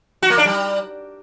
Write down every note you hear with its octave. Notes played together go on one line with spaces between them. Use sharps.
F#4
A#3
D4
G3